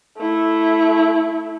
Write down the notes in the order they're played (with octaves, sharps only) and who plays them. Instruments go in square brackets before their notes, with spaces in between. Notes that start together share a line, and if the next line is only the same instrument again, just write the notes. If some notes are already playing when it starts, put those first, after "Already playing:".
[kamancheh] A3 E4